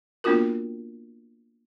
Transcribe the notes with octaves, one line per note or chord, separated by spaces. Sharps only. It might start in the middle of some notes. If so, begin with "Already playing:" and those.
A#3 B3 D4 F4 F#4 A#4